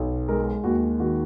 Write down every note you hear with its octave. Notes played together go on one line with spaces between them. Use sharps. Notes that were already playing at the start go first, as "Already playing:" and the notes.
Already playing: B1
G#3 A#4
D#2 F#4
D#3 F#4